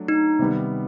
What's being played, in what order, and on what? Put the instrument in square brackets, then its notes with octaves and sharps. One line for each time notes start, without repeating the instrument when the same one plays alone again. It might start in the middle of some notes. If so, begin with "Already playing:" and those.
Already playing: [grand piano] F#3 A3 D4
[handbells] D#4
[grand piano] C3 D#3 G3 B3